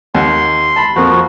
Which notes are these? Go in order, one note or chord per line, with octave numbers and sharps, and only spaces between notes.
D#2 F#5 C6
A5 B5
F2 F3 A#3 F#4